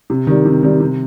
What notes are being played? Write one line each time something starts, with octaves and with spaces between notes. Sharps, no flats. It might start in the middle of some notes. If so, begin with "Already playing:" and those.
C3
D#3 G3
C3
D#3 G3
C3